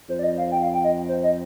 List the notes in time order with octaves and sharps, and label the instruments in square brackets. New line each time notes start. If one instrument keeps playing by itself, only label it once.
[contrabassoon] F2 [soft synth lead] C5
[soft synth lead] D5
D#5
F5
G5
F5
G5
D#5
C5
D#5